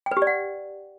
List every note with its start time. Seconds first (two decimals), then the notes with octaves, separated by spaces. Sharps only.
0.06 G5
0.11 B4
0.17 G4
0.22 D5
0.27 F#5